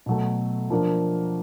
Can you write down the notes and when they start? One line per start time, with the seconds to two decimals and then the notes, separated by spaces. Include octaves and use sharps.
0.06 B2 F#3 A3
0.70 F3 A#3 D4